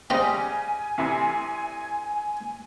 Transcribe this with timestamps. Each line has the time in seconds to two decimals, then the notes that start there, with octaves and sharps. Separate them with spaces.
0.10 C#3 G3 C5 D#5 G5 G#5 A#5
0.98 D2 C3 E3